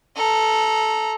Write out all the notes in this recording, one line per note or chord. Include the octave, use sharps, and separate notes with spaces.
A4 A#5